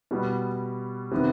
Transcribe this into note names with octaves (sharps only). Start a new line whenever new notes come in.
B2 G3 B3
C3 D#3 B3